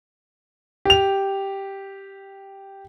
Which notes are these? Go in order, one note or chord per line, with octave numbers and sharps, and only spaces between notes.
G4 F7